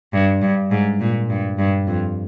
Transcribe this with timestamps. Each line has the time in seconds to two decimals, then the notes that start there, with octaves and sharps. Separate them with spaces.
0.13 G2
0.42 G2
0.71 G#2
1.00 A#2
1.30 G2
1.59 G2
1.87 F2